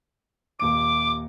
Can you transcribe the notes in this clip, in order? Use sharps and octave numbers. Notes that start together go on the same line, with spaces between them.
D#1 D#2 D6 D7